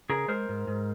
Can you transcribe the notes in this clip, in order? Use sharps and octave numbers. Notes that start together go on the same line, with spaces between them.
C#3 G#4 A#4
G#3 A#4 C5
G#2
G#2